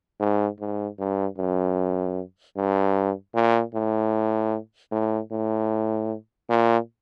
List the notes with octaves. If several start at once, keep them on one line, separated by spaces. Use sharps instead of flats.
G#2
G#2
G2
F#2
G2
A#2
A2
A2
A2
A#2